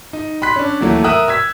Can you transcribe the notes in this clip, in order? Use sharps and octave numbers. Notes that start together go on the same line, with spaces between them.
D#4
B5 C6 F#6 B6
C#4 D4
D#2 E3 F#3 A3
A#4 E5 A#5 D#6 E6 F#6
E6 G#6 B6